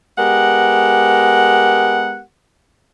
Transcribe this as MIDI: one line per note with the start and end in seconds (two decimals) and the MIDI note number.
0.18 2.20 56
0.18 2.20 59
0.18 2.20 67
0.18 2.20 70
0.18 2.20 78